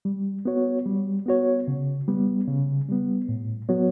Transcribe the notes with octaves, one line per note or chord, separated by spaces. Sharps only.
G3
B3 F#4 C#5
G3
B3 F#4 C#5
C#3
G3 B3
C#3
G3 B3
A2
F#3 B3 F#4 C#5